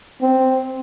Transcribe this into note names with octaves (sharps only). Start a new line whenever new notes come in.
C4